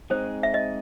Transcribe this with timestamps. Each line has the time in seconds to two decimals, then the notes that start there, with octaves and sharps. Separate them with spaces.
0.10 G#3 C4 D#4 G#4 C5
0.43 E5
0.54 D#5